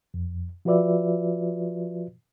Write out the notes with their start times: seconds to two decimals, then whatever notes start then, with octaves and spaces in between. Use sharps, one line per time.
0.14 F2
0.65 F3 F4 F#4 B4 D5 E5